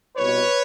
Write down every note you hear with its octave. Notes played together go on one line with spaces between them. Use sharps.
C2 B2 B4 C#5